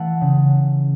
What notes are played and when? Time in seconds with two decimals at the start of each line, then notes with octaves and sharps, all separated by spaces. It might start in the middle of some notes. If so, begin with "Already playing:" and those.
Already playing: E3 A3 F#5 A5
0.21 C#3